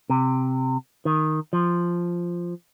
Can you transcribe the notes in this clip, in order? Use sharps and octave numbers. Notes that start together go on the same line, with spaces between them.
C3
D#3
F3